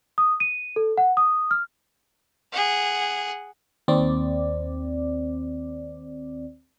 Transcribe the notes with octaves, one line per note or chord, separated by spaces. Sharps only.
D#6
D#7
A4
F#5
D#6
F6
G#4 F#5
D#2 C4 D5